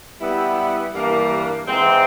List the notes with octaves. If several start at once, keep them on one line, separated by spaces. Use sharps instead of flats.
G3 B3 E4
G2 E3 G3 A#3
G#2 E3 G#3 C4